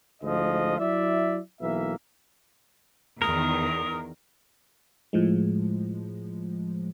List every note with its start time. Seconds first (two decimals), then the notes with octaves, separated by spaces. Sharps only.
0.22 D2 G#2 F3 D#5
0.78 F#3 E4 D5 E5
1.61 B1 E3 A#3 E5
3.22 E2 D#3 A#4 D#6
5.13 A2 F3 G#3